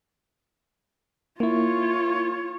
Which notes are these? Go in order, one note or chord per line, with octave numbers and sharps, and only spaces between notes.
A#3 E4 F4 C#5